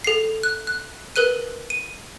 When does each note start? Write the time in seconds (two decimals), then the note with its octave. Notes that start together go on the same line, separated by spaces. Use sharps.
0.04 A4 C7
0.43 F#6
0.67 F#6
1.16 A#4 B4 F#6 D#7
1.70 D#7